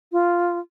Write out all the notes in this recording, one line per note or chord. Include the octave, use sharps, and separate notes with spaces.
F4